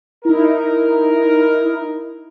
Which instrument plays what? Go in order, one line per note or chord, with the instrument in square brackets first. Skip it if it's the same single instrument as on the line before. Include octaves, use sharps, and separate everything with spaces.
[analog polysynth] D#4 E4 [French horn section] A#4